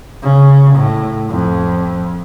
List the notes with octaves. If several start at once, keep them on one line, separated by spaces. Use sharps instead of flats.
C#3
A2
F2